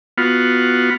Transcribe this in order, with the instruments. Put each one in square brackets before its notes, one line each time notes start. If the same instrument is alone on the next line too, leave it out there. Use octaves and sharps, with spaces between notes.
[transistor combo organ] B3 F4 F#4